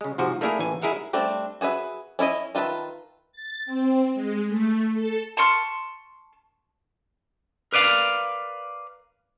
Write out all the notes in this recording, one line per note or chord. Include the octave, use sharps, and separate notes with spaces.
C#3 G#3
G#2 C3 F3 F#4
A3 A#3 D4 E4 G#4 A#4
A1 E3 G#5
G#3 E4 G#4 A#4 E5 F#5
G3 A3 C4 D4
F#4 G#4 B4 E5
C#4 E4 F4 D#5
D#3 F4 B4 E5 A5
A6
C4
G#3
A3
A4
A5 C6 C#6 F6
A#4 B4 D5 F5